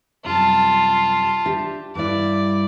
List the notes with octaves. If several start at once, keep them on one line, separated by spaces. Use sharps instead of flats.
F#2 C3 G3 F4 A5
D4 G4 E5
G2 G3 E4 D5